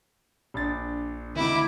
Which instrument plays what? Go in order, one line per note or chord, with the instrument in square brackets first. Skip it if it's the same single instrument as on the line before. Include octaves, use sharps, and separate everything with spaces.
[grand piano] A#1 D4 A6
[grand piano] D2 D#3 [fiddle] E4 D6